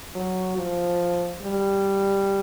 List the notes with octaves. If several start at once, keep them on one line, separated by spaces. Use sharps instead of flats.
F#3
F3
G3